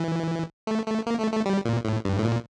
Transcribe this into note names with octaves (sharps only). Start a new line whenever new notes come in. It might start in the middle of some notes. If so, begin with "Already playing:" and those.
Already playing: E3
A3
A3
A#3
A3
A3
G3
A#2
A2
G2
A2
A#2